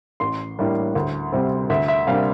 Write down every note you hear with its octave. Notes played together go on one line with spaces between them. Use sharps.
A1 C6
A2 G3 A#3 D4
D2
C3 G3 C4
D2 E5
E5
C3 G3 A#3 D4 F5